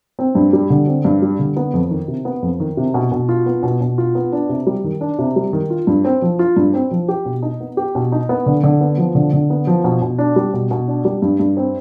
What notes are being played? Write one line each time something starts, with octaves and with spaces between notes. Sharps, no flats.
C4
G2
G3
D3
C4
G2
G3
D3
B3
F2
D#3
C3
B3
F2
D#3
C3
B2
B2
F4
B3
B2
B2
F4
B3
D4
C3
G3
D#3
D4
C3
G3
D#3
F4
G2
C4
F3
F4
G2
C4
F3
G4
B2
D#4
B3
G4
B2
D#4
B3
D3
D3
B3
F3
D3
D3
B3
F3
B2
B2
D4
G3
B2
B2
D4
G3
G2
G2
C4